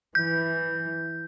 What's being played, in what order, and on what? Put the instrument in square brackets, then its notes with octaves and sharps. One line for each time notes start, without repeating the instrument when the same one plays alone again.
[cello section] E3 [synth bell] G6